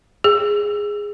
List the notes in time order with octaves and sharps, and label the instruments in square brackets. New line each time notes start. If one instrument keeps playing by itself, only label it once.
[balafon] G#4